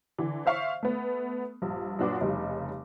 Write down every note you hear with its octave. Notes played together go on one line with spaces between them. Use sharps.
D3 E3
C5 E5 F5 C#6
A3 B3
A#1 G2
F#2 A#2 D4 F#4 B4 D6
F1 C#3 G3 D#4